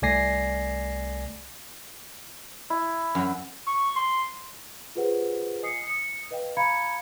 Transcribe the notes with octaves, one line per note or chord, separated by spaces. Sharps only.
C2 A3 D5 G#5 A#6 C7
E4
F#2 F#3
C#6
C6
F4 G4 G#4 B4 C5 F#5
D#5 G#5 D#6 C7 C#7
D#6 C#7
B4 D#5 F5 G5
F5 A#5 B5 G#6 C#7